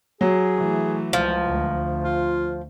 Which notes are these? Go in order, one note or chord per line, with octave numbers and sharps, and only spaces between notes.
F#3 G#4
E3 A3
C#2 F3
D2
F4